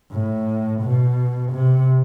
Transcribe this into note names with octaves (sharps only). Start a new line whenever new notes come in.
A2
B2
C3